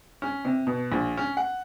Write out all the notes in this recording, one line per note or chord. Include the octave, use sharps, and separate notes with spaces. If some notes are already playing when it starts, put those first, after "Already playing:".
C#4
C3
B2
A#1
C#4
F#5